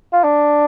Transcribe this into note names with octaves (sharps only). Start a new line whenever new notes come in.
F4
D4